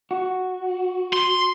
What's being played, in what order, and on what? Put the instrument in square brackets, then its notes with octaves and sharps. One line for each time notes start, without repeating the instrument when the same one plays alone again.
[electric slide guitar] F#4
[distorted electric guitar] C6